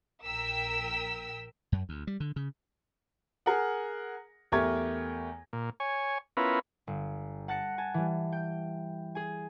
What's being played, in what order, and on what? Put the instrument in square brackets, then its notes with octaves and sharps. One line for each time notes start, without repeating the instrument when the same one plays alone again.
[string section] A#1 A#4 G5 E6 B6
[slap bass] F#2
D2
G3
D3
C#3
[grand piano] G#4 A#4 F#5
E2 A3 G4 A#4 C#6 G#6
[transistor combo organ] A#2
C#5 G#5
B3 C#4 E4 F4 A#4 B4
[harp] G1
F#5 A5 F#6 A#6 C#7
G#5 A5
E3 G3
G5 G6
G#4 G#5